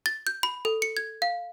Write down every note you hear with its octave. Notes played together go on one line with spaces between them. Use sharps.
A6
G6
B5
A4
C#7
G#6
F5